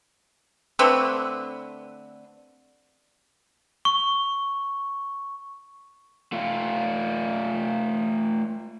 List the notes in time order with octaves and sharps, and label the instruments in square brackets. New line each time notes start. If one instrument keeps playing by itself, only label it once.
[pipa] D3 A3 C4 B4
[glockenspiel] C#6
[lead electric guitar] A3 F4